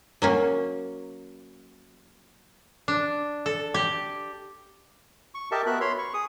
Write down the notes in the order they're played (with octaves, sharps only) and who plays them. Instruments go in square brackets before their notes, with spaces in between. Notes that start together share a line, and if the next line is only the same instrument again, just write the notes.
[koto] F#3 A#3 C#4
D4
A4
G4
[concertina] C#6
G4 A#4 D#5 E5 A5
B3 F#4 A#4 E5 F#6
C#5 B5 C6
C#6
G#4 D#6